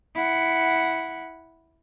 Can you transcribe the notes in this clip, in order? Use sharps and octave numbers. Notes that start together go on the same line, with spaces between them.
E4 F#5